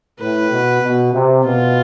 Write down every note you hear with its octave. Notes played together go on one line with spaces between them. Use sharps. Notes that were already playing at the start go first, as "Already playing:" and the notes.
A2 B4
B2
B2
C3
B2 F4